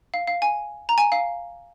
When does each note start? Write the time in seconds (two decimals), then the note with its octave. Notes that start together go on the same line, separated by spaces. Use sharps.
0.14 F5
0.27 F5
0.42 G#5
0.89 A#5
0.98 G#5
1.12 F5